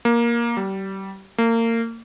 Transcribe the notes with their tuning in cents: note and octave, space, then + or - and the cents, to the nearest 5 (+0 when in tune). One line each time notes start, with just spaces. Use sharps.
A#3 +10
G3 -30
A#3 -30